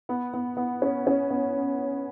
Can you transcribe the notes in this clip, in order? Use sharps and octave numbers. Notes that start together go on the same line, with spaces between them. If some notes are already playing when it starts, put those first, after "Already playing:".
B3
B3
B3
C#4
C#4
B3